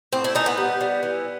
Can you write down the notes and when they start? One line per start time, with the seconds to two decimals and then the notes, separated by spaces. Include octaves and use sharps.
0.12 A2 C4
0.24 E4
0.35 E3 D#4
0.46 B3
0.57 G3
0.81 G3
1.03 E3